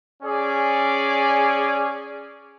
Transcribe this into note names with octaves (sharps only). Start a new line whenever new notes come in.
C#4 G#4 D5